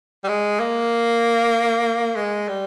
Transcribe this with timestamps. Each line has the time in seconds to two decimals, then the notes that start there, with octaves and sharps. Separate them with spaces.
0.24 G3
0.28 G#3
0.60 A#3
2.16 G#3
2.49 G3